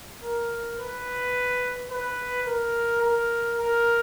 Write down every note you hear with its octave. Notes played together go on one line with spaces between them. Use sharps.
A#4
B4
B4
A#4
A#4
A#4